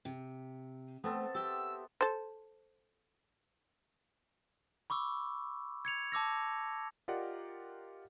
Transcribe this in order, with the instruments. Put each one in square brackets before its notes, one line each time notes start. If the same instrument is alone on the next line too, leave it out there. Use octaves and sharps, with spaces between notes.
[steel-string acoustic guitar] C3
[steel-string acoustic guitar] A3 [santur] B3 C4 A4
[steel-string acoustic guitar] G4 E5 [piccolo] E6
[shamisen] A4 C5
[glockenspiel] B5 C#6 D6 E6
G#6 C#7 F7
A5 D6 E6 A#6
[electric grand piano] F4 G4 A#4 D5 D#5 F#5